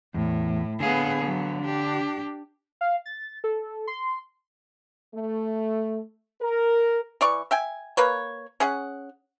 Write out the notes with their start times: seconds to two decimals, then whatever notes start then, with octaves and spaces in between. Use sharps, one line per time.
0.14 E2 A2
0.80 D3 B3 G#4 F5
1.21 F#3 B3
1.61 D4 G4
2.81 F5
3.06 A6
3.44 A4
3.87 C6
5.15 A3
6.41 A#4
7.21 E3 D5 C#6
7.51 E5 G5 G#5
7.97 A#3 B4 C#5
8.60 C#4 G#4 F#5